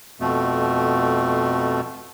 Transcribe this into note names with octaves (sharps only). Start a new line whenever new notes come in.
F2 B2 A3